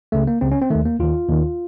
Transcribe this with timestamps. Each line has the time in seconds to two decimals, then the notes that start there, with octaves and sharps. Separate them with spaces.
0.12 C#2 C#3 A3
0.27 A#3
0.41 C#2 C#3 C4
0.51 C#4
0.62 C4
0.70 D#2 D#3 A3
0.85 A#3
1.00 D#2 D#3 F4
1.29 D#2 D#3